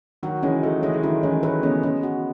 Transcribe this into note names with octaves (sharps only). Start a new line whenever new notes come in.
D#3 F#3 F#4
E3 G#3 C#4
F#3 A3 D#5
E3 G#3 D#5
G#3
D#3 F#3 E4
E3 G#3 C#4
F#3 A3 B4
G#3 B3 C#4
G#3 B3 C#4
F#4